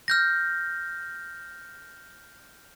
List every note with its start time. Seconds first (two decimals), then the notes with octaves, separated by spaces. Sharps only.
0.08 F6 G6 A#6